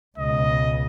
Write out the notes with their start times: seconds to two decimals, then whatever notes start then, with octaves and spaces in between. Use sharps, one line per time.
0.18 C#2 B2 D#5